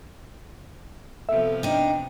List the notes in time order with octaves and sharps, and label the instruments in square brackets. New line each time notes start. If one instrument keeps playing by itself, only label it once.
[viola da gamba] C3 F3 B3 [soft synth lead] A4 [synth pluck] E5
[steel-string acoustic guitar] D4 D#4 [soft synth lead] G5